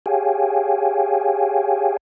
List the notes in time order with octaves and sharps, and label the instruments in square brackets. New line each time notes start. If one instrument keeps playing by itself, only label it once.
[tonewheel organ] G4 G#4 C#5 F5 G5 G#5